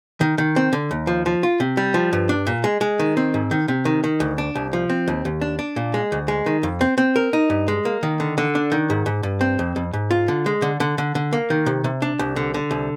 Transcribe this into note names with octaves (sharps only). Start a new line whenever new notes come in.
D#3
D#3
C4
D3
D#2
F3
F3
F4
C3
G3
F3
G2
D4
A#2
G#3
G#3
D#3
C4
G#2
D#3
C3
D#3
D#3
D2
D4
C2
F3
C4
D#2
D#2
D4
D4
A#2
G#3
D2
G#3
D#3
F2
C4
C4
A#4
D#4
G2
G#3
A#3
D#3
D3
D3
D4
D#3
G#2
G#2
G2
C4
F2
F2
G#2
F4
D3
G#3
D3
D3
D3
D3
A#3
D#3
C3
C3
D4
C2
D3
D3
C2